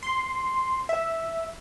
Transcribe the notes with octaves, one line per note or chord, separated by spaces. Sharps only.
C6
E5